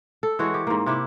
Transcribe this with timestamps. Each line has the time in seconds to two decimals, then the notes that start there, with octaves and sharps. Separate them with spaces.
0.23 A4
0.39 E3 G#3 F#4 C#5
0.54 G4
0.67 G#2 A#3
0.86 C3 E4 G4